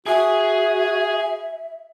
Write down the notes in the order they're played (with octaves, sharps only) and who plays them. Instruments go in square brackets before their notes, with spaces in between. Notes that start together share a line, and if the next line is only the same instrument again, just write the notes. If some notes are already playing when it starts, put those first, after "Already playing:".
[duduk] F#4 [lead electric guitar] G#4 G#5 [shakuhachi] E5